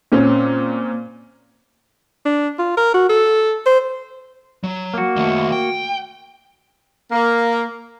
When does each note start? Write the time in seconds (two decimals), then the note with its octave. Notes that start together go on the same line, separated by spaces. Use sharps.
0.12 A#2 C4 C#4
2.25 D4
2.59 F4
2.77 A#4
2.94 F#4
3.09 A4
3.66 C5
4.64 F#3
4.94 A#3 F#4
5.16 D#3 A3
5.52 G5
7.12 A#3